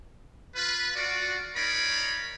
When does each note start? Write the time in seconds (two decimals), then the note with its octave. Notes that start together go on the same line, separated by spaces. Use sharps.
0.55 F4 B4
0.96 F4 F#4 D5
1.56 D#4 F4 A#4 C#5 D5 B5